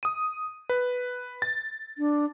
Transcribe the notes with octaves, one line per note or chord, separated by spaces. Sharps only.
D#6 D#7
B4
A6
D4